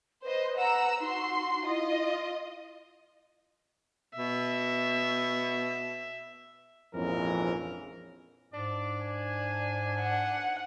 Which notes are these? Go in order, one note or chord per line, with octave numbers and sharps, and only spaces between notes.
B4 C5 D#5
F#5 A#5 E6
D#4 F#4 C6
E4 F4 D#5
B2 E5
A#1 F2 G#2 E3 C#4 A#4
G#2 D4 D5
G#5
F#5